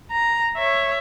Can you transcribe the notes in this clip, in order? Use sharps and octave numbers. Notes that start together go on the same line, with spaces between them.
A#5
C#5 E5